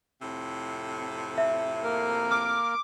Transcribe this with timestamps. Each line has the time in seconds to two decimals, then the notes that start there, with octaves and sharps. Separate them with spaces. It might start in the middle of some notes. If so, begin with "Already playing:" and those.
0.22 F2 A2 C3
1.38 E5
1.83 A#3 A#4
2.31 D6 F6